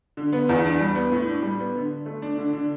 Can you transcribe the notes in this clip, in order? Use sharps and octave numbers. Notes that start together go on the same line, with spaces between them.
D3
B3
E2
D4
G3
B3
A2
D4
G3
B3
D3
D3
A3
D4
D3
D3